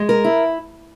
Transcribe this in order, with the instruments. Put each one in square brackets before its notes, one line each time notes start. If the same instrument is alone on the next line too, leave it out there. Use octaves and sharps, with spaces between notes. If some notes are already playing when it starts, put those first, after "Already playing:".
Already playing: [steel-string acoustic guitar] G#3
A#4
E4